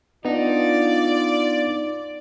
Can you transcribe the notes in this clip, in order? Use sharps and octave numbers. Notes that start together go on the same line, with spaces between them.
B3 D4 D#4 F4 D5 D#5